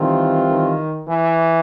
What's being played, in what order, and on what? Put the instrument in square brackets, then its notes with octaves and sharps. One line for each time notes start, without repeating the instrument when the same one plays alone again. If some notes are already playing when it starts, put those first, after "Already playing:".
Already playing: [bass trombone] D#3 [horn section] E3 G3 C4 F4
[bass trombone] D#3
E3